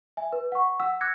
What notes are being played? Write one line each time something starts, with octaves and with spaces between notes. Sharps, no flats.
E5 G#5
B4
F#5 C#6
F#5 E6
D6 E6 F#6 G#6 A#6 C#7